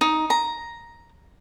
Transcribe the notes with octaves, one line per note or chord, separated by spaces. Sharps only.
D#4
A#5